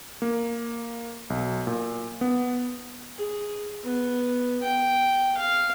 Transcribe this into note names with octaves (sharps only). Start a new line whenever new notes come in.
A#3
B1
A#2
B3
G#4
B3
G5
F5